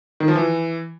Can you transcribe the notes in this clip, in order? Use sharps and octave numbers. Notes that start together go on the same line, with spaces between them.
D#3
F3
E3